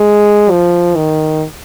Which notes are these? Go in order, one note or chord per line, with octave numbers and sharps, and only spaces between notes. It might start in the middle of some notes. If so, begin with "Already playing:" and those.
Already playing: G#3
F3
D#3